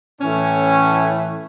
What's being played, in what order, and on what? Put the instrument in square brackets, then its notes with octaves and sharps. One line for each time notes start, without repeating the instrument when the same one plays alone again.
[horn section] A2 E3 A3 C#4